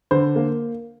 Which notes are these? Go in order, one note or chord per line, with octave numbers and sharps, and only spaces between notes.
D3 C5
A#3